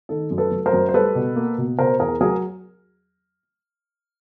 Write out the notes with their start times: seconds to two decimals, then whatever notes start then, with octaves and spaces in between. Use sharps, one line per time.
0.09 D#3 A4
0.31 F#2
0.38 A4 B4
0.51 F#3
0.66 A#4 C5
0.73 F#2
0.89 C5
0.94 G3 A4 B4
1.15 B2
1.36 A#3
1.58 B2
1.79 B2 A#4 C5
2.00 E2 G#4 A#4
2.21 F#3 G#4 A#4